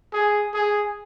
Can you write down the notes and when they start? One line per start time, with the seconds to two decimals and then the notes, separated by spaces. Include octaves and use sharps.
0.13 G#4
0.54 G#4